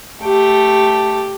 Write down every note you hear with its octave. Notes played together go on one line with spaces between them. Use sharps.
A3 G4